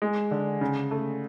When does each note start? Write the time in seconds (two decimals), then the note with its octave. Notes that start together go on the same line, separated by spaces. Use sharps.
0.02 G#3
0.31 D3
0.61 C#3
0.91 A3